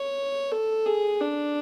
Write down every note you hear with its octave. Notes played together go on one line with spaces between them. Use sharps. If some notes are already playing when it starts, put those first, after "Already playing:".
Already playing: C#5
A4
G#4
D4